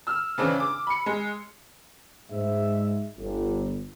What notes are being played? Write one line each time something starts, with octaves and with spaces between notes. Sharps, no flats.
E6 F6
C#3 E3 C4 D4
D6
B5 C#7
G#3
G#2 G#3 E5
G1